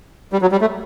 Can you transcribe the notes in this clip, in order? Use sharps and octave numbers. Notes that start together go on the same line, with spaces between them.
G3
F#3
G3
A3